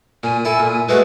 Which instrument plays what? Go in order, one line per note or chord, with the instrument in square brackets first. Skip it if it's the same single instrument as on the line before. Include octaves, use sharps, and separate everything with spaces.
[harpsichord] A#2 [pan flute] G#5
[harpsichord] E4 A4 [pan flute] G#5
[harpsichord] A#2
[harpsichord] G#3 A3 F#4 [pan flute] B4